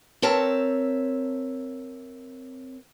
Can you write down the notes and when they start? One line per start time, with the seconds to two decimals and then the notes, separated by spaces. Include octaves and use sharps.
0.22 C4 A#4 C#5 E5 A5